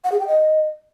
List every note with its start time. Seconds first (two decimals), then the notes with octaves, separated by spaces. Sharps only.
0.04 F#5
0.12 G#4
0.20 G5
0.27 D#5